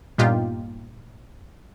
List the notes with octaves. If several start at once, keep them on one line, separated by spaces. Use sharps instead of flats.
G2 A#2 B3 D#4 F4 G4